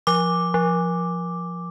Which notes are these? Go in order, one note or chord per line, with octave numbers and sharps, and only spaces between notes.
F3 D6
F3